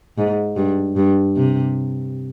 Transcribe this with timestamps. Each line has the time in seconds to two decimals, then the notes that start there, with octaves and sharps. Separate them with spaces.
0.18 G#2
0.56 G2
0.97 G2
1.36 C3